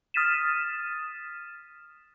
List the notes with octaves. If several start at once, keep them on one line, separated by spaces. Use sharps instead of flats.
D#6 F6 A6 B6 D#7 E7